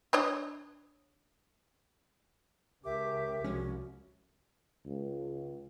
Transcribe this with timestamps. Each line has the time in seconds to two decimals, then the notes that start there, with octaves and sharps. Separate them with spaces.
0.13 D4 C#5 D#5
2.85 C#2 C#3 G4 A#4 E5 D6
3.44 C2 F3 G#3 C#4 F#4
4.86 C#2